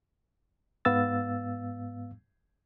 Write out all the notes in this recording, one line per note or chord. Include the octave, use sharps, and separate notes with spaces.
G#2 B3 F5 E6 A6